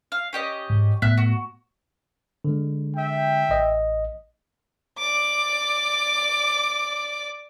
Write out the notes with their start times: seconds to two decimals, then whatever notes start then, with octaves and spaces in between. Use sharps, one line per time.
0.12 F5
0.33 C#4 G4 D#5
0.70 G#2
1.02 A2 A3 B3 E5 F#6
1.17 F#4
2.44 D3 G#3
2.97 E5 G5
3.49 A1 D#5
4.98 D5 D6